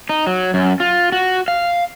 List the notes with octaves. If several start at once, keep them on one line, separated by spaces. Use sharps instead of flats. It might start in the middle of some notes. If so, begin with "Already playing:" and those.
D#4
F#3
F#2
F4
F#4
F5